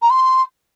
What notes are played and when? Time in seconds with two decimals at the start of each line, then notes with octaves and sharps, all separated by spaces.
0.02 A#5
0.10 C6